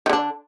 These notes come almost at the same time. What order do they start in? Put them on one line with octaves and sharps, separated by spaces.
D#3 D3 D4